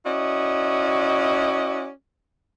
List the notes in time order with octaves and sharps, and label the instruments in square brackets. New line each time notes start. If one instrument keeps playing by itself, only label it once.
[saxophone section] C#4 E4 F#4 D5 D#5